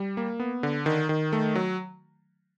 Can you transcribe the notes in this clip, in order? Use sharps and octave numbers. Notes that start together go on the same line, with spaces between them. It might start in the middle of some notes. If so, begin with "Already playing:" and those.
Already playing: G3
A#3
B3
D3
D#3
D#3
A3
F#3